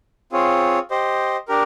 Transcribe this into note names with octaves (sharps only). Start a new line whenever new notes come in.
C4 F4 G#4 C#5
G4 C5 D#5
D4 G4 A#4